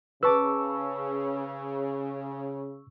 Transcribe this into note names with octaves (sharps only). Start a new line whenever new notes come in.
C#3 B4 A5 C#6 D6 E6